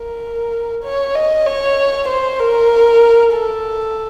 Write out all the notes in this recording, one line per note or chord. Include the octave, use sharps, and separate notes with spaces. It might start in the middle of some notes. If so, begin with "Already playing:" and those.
Already playing: A#4
C#5
D#5
C#5
C5
A#4
A4